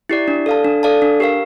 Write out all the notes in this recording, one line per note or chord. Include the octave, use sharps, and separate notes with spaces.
E4 G4 D5
D4
A4 D5 F5 A5
D4
A4 D5 F5 A5
D4
G4 A#4 F5